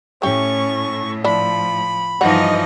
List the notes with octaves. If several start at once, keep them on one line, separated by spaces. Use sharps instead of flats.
A2 A3 C#4 G4 C#6
F3 D4 E4 B5
G2 E3 F3 D#4 C#5 D#5 F#5